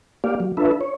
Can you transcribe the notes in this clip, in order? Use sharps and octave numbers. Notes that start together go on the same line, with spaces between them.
A#3 G4 D5 F5
F#3
D4 F4 A4 B4 E5
C#5